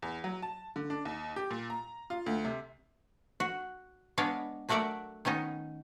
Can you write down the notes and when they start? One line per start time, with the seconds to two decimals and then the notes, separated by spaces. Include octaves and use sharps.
0.02 E2
0.24 F#3
0.42 A5
0.76 D3
0.90 D4
1.05 D#2
1.36 G4
1.50 A#2
1.70 A#5
2.10 F4
2.26 D2
2.45 C3
3.40 F#4
4.18 G#3 B3 D4 C#5 F5
4.69 F#3 A3 F#4 A#4 D5 E5
5.25 D#3 B3 C#4 D#4